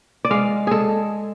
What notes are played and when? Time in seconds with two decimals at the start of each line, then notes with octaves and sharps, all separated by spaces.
0.25 D5
0.31 G#3 F5
0.67 G#3 G#4 A4